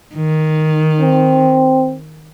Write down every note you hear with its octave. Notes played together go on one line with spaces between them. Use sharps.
D#3
C4